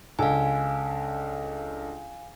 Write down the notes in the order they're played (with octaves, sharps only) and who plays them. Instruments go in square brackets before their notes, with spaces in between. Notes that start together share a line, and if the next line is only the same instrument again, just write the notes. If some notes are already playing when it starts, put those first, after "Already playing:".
[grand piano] C#2 D4 A4 [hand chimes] F5 G#5